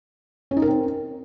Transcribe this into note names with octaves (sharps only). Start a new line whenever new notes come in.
C#4
D#4
A#4
C4